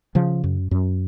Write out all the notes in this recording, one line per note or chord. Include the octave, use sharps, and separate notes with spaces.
C#3 F3
F#2
F#2